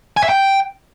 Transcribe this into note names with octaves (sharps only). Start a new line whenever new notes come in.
G#5
E5
G5